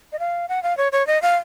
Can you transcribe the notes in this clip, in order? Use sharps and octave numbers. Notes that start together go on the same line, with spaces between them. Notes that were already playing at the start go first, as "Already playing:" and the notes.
D#5
F5
F#5
F5
C#5
C#5
D#5
F5